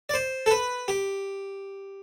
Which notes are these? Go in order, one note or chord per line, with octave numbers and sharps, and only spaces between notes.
D5
C5
A4
B4
G4